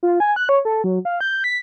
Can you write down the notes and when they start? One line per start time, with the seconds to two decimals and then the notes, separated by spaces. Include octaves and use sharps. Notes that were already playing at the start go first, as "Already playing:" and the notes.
0.03 F4
0.20 G#5
0.36 F#6
0.49 C#5
0.65 A4
0.84 F#3
1.05 F5
1.21 G6
1.44 B6